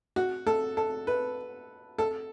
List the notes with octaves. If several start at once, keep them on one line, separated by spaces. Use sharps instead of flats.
F#4
A4
A4
B4
A4